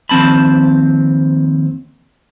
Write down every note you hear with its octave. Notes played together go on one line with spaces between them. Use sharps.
D#2 F3 C4 A5 B5